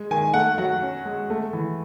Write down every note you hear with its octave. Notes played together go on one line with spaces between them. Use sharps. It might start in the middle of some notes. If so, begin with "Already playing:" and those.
Already playing: G#3
D#3 G#5
A3 F#5
F#3 F#5
C#4
G#3
A3
E3